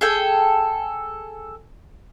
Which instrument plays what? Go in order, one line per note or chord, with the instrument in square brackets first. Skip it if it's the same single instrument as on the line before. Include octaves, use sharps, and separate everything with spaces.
[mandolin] G#4 A4 G5